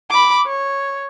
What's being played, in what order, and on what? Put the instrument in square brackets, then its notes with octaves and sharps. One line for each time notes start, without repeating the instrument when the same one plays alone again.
[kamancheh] B5 D6
C#5